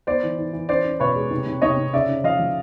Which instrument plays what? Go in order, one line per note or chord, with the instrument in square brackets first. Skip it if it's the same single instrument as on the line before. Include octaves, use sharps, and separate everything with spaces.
[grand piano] B3 C5 D5
E3
E3
E3
C#4 C5 D5
C#4
B2 B4 C#5
G#3
C3
C3
C3 C#5 D#5
C3
C#3 D5 E5
C#4
F3 D#5 F5
F3